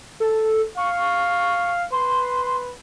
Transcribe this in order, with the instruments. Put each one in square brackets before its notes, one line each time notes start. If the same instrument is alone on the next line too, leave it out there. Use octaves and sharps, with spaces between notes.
[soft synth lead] A4
[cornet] F5 [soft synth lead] C#6
[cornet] B4 [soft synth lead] C6